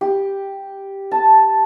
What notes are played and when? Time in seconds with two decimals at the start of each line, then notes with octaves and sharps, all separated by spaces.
0.01 G4
1.11 A5